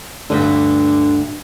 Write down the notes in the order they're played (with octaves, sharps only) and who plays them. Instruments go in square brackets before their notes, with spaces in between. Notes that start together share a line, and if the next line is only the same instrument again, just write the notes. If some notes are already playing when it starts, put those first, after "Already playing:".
[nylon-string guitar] D2 G2 G5 [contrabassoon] D3